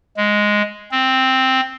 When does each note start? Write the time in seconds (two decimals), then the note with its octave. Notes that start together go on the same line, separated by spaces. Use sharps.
0.17 G#3
0.91 C4